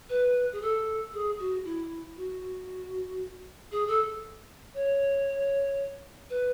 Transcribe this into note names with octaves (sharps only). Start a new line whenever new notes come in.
B4
G#4
A4
G#4
F#4
E4
F#4
G#4
A4
C#5
B4